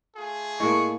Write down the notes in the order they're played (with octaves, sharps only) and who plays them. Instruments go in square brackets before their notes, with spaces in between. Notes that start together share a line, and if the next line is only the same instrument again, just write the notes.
[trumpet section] A3 F4 G#4
[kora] A2 A#3 [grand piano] G#3 [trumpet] C#6